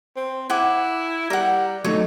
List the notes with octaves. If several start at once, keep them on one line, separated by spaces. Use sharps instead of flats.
C4
E4 F#5 G#5 D6
G3 A#4 F#5
F#3 A3 D#4 C#5